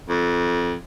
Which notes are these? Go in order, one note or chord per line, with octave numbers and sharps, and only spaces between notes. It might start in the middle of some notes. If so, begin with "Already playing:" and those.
F2